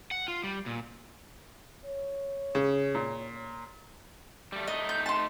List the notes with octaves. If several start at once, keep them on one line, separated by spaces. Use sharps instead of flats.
F#5
F4
G3
A#2
C#5
C#3
A#2
G3 A3
A3 D#4 D#5
G6
A5 C6